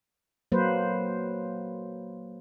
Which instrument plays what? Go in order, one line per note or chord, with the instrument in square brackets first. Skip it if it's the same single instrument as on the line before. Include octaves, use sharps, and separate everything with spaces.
[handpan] F#3 A#3 B4 C5